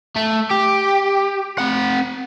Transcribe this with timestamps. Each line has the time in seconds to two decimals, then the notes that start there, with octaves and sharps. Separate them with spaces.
0.16 A3
0.51 G4
1.58 C4 F#5